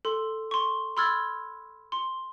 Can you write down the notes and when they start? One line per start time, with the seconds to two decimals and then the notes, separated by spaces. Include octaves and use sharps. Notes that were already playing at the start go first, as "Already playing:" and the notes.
0.05 A4 C6
0.51 C6 C#6
0.97 B5 C6 E6 F6 G#6 A6
1.92 C6